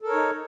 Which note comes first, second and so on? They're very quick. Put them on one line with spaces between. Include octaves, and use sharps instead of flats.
A4 A#4 C#5 D#4